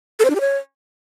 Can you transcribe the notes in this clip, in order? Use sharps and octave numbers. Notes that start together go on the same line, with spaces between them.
A4
C5
D4
G4
C#5